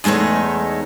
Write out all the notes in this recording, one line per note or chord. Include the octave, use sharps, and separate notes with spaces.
E2 G#3 A3 D#4 C#5